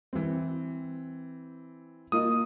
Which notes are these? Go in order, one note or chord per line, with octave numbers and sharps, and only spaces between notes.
E3 C4
A#3 F4 D#5 D#6